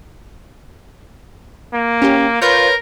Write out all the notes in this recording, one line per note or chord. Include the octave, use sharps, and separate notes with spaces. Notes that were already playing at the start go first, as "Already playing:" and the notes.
A#3
C#4 G4
F4 A#4 B4 C#5 G6